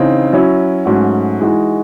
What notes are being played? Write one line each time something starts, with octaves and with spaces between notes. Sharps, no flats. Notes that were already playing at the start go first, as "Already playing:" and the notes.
Already playing: C#3 E3 C4 D#4
F#3 C#4 E4
G#2 F#3 A3 C#4 F#4
E3 G#3 D#4 F#4